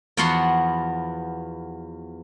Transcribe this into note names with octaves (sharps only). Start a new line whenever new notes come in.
E2 F3 B3 F#4 F#5 C6